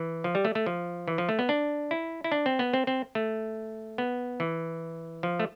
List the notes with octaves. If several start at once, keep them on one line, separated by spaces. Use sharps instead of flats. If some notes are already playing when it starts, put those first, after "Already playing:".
Already playing: E3
F3
G3
A3
A3
F3
E3
F3
A3
B3
D4
E4
E4
D4
C4
B3
C4
C4
A3
B3
E3
F3
A3